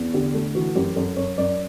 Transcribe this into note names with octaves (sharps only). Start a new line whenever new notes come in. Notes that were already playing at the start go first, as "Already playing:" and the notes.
Already playing: E2
D3 G4
A3
E3 F#4
F#2 G4
F#2 A4
F#2 C#5
F#2 D5